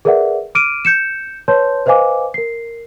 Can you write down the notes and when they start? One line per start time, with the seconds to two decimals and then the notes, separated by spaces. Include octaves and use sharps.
0.05 G#4 A#4 B4 D5 E5 F#5
0.55 D6 F6 D7 D#7
0.85 G6 C#7 E7
1.48 B4 C#5 A5 C6 G6
1.86 B4 C5 D#5 F5 G#5 D6
2.34 A#4 C7